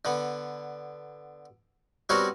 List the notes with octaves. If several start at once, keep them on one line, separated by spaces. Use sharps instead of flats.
D3 B3
G3 B3 C4 F#4 A#4 C#5